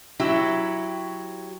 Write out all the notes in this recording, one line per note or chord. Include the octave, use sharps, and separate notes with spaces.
F#3 E4 G4